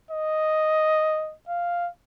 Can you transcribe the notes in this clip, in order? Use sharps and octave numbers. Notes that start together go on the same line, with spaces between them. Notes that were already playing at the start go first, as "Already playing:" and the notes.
D#5
F5